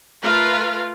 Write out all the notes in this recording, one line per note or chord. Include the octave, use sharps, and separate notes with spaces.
A3 F4 A#4 B4 F5